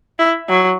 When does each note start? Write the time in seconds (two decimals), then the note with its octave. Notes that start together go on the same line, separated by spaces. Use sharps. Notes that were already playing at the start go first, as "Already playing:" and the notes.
0.19 E4
0.49 F#3